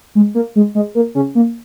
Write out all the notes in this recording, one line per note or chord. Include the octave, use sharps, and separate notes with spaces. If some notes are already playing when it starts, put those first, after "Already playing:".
G#3
A#3
G#3
G#3
A#3
C#3 C#4
A#3